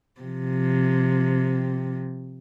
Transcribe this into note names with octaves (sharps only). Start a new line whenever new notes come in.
C3 F3